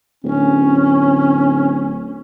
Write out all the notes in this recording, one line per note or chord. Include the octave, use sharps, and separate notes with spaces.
D1 C#4